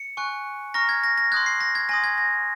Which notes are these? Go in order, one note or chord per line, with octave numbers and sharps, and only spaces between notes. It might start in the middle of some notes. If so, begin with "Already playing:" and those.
Already playing: C#7
G#5 C#6 F#6
A#5 C#6 F6 A#6
G#6
A#6
A#6
C6 D#6 F#6 G#6
C7
A#6
G#6
G#5 C6 D#6 A#6
G#6
A#6